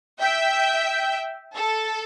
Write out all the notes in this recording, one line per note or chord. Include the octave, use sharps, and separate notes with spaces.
E5 G5
A4